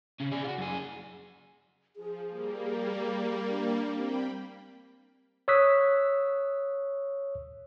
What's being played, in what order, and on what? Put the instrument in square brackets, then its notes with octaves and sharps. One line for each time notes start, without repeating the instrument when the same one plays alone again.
[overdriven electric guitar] C#3 C#4
G#4 D5
F4 F#4
F#2 G#4
[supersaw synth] F3 [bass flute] G#4
[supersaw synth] G3 A#3
[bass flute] D4
[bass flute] C4 [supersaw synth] G5 B5
[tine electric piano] C#5 C#6 D#6 E6 F#6 B6